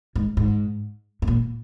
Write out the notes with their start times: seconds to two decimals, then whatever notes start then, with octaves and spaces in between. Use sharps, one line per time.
0.16 G#2
0.37 G#2
1.22 G#2
1.28 A#2